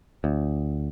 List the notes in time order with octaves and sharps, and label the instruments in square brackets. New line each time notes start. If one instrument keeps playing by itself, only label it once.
[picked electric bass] D2